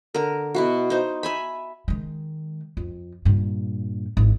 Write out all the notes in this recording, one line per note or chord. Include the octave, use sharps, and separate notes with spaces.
D3 A#4
B2 E4 F#4
D#4 C5
E5 G#5 B5
D#3 G#3
F2
G2 A#2
G#1 E3